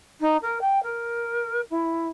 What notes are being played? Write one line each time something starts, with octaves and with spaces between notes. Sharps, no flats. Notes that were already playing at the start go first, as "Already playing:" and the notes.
D#4
A#4
G5
A#4
E4